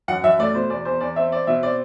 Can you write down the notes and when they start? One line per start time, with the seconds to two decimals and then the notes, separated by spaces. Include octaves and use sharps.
0.08 F#2 F#5
0.23 F#2 E5
0.39 A3 D5
0.54 B2 C5
0.70 E2 D5
0.85 E2 C5
1.00 E2 D5
1.16 C4 E5
1.32 C4 D5
1.47 B2 E5
1.63 C4 D5